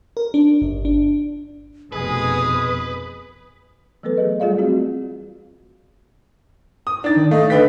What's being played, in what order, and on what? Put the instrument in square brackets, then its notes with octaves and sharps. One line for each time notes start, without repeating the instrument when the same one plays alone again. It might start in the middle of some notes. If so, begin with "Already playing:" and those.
[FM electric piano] A#4
D4
G1
D4
[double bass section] F1 B2 [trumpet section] G#3 G#4 [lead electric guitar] B4 [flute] D#6
[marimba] E3 F#3 A3 B3 A4 B4
G#4 D#5
G3 A3 F4 G#4 D5 F5
C4 F4 F#4 G#4
[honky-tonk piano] D#6
[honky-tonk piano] D4 A6 [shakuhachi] D#4
[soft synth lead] D#3
[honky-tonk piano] A3 [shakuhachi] D#5 [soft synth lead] F5
[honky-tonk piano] D3 G5 B6 [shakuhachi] B4